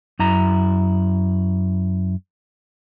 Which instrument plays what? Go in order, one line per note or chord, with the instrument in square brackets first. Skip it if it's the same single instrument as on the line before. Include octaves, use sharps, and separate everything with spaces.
[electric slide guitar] F#2 E4 A#5